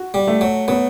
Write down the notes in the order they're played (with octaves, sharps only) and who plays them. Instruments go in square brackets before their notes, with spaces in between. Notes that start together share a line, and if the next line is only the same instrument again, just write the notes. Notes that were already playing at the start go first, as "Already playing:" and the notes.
Already playing: [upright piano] F#4
[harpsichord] G3
[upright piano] A3
[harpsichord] F#3
[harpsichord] F#3 [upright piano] B3